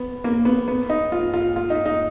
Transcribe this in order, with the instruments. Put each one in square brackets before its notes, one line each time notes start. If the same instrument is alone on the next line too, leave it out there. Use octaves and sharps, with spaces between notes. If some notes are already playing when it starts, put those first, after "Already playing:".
Already playing: [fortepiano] B3
A#3
B3
B3
D#4
F4
F4
F4
D#4
D#4